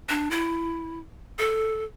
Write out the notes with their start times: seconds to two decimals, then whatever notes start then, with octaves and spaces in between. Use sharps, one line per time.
0.09 D4
0.31 E4
1.39 A4